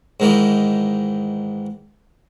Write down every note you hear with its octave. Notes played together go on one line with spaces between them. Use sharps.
G#2 D#3 E3